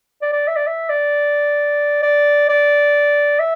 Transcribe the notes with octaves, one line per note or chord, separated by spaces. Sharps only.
D5
D5
E5
D5
E5
D5
D5
D5
E5